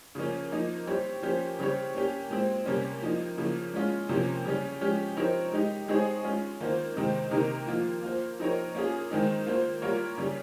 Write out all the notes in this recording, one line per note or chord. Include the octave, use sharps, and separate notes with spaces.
C#3 F3 A#3 C#4
F3 A#3 D#4
G3 C4 G4 C#5
F3 A#3 C#4 G4 C5
C#3 G3 C4 G4 C#5
A#3 C#4 G4
A#2 G#3 C4
C3 G3 A#3 C#4
F3 A#3 D#4
C#3 F3 A#3
G#3 C#4 F4
C3 F3 A#3 C#4
C#3 G3 C#4
F3 G#3 C#4 G4
F3 C4 D#4 A#4 C#5
G#3 D#4 G4
G#3 C4 D#4 G#4 C#5
G#3 C#4 F4
D#3 A#3 F4 C5
C3 D#3 G#3 C4 D#4
C3 D#3 A#3 D#4 A#4
F3 A#3 F4
A#3 F4 C5
F3 C4 D#4 A#4 C#5
A#3 C#4 F4 G#4
D#3 G#3 C4 D#4
A#3 F4 C5
G3 A#3 F4 A#4 C#5
C#3 G3 C#4